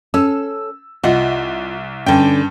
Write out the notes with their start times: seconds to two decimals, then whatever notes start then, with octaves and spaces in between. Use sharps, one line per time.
0.14 C#4 A4 E6
1.04 C2 F4 D#5 F#5
2.06 G2 D3 C#4 G5